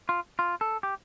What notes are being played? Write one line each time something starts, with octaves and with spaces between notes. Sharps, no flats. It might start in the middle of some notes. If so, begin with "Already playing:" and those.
F4
F4
A4
G4